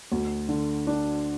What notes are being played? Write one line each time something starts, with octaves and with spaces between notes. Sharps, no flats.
D2
D3
D4